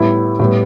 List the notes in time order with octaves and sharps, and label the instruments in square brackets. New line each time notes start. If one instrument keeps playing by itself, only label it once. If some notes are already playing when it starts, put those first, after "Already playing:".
Already playing: [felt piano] A2 G3 B3 E4
A2 G3 B3